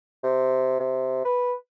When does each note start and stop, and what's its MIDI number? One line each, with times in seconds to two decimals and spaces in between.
0.24 0.77 48
0.80 1.24 48
1.25 1.53 71